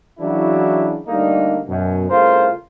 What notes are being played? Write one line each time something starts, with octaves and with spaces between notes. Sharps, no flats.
C#3 E3 F#3 D4 E4 F#4
D3 G3 A3 A#3 D#4
F#2 B2
C2 C#3 A3 F4 A#4 C5